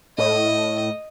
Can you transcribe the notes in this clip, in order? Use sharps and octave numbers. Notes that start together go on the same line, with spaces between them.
A2 D#5